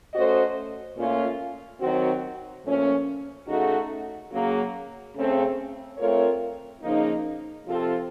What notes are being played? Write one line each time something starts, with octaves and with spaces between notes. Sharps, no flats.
A3 C#4 F#4 C5 D#5
A#2 A3 C#4 F4
D#3 F#3 C4 F#4
A#2 F3 A3 C#4
C#3 A3 D#4 F#4
C#3 F#3 A#3
C#3 A3 C4
A3 C4 F4 A#4 C#5
C#3 F3 A#3 D#4
C3 F3 C4 F4 A4